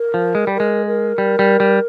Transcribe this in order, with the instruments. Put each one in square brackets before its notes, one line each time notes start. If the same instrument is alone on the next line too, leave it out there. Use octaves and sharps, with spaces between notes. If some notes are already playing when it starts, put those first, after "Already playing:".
Already playing: [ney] A#4
[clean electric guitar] F3
G#3
G3
[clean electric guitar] G#3 [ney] A#4
[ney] A#4
[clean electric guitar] G3
G3
G3